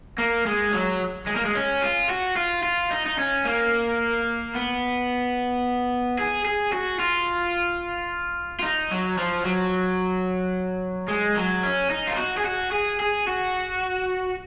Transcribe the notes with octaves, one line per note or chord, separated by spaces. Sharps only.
A#3
G#3
F#3
G#3
A#3
G#3
C#4
F4
F#4
F4
F4
D#4
D#4
C#4
A#3
B3
G#4
G#4
F#4
F4
F4
D#4
F#3
F3
F#3
G#3
F#3
C#4
D#4
F4
F#4
G#4
F#4
G#4
G#4
F#4